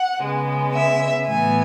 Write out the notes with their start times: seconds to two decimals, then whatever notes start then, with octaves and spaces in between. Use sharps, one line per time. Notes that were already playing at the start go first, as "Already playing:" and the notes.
Already playing: F#5
0.21 C#3 G#3 B3
0.74 E5
1.27 A2 E3 B3 G#5